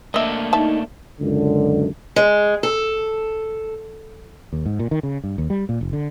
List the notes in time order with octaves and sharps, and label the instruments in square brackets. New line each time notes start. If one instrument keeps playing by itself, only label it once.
[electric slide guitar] A3 A#3 D4 [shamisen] D#5 E5
[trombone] D#4 [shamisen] E5 A5
[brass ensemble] C#2 F#2 D3
[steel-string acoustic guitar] G#3
A4
[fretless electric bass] D#2
G#2
A#2
D#3
C#3
G2
D#2
G3
A#2
F1
D3